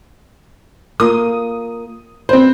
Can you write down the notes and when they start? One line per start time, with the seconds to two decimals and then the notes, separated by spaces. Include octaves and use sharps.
1.00 A#3 F4 D#6
2.29 C4 B4 C5